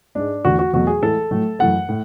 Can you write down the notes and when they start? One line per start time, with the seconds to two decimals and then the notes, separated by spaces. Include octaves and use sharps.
0.15 G#2 G#3 D4
0.45 E2 D3 A3 F#4
0.59 F#4
0.73 E2 B2 F#3 A3 F#4
0.87 G#4
1.02 A2 E3 G#3 A4
1.31 A2 F#3 A3
1.59 F#2 E3 A3 F#5
1.89 A2